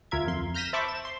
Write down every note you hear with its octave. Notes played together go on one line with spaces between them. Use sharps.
D2 F4 A#4 E5 G#6
F2 C6
F6 G6 A#6 B6 D#7 E7
C5 E5 A5 B5 C#6 D6
E7
C6